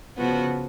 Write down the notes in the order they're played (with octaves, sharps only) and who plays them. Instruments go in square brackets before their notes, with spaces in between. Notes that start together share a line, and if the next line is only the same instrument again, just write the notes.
[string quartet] C#3 F3 B3 F#4